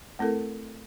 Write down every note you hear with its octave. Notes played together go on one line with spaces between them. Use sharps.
A3 C4 E4 A4 A#4